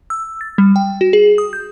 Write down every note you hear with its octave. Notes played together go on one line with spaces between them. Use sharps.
E6
A6
G3
G5
F#4
G#4
D#6
G6